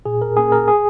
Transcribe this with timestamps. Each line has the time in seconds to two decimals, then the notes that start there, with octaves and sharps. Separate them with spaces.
0.06 A#2 G#4
0.22 A#4
0.37 A#3 C#4 G#4
0.52 A#4
0.68 G#4